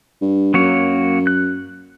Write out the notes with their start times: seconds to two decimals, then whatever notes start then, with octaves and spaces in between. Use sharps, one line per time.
0.21 G2
0.54 F#2 F#3 A#3 C#5
1.27 F#6